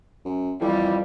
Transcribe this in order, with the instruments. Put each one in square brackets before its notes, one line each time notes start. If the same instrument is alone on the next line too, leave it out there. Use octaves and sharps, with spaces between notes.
[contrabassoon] F#2
[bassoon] F2 [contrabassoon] E3 [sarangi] G3